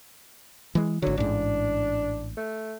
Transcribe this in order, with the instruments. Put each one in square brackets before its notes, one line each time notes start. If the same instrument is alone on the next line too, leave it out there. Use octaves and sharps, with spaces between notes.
[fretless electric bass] E3 G#3
[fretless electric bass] G#1 D3 [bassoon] F#3
[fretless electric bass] A1 G#2 [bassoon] D4
[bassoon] A3